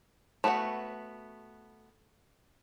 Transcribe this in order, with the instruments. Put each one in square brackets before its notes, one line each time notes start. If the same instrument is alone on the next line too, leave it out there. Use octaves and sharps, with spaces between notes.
[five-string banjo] A3 B3 F#4 D5 F#5